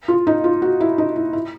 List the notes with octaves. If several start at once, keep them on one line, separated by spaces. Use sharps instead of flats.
F4
D#4
F4
F#4
E4
D#4
E4
E4